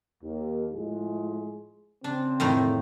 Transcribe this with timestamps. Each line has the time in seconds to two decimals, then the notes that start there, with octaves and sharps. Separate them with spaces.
0.22 D#2
0.74 A2 F3 G#3
2.04 C#3 C4 D4
2.40 F2 A2 D#3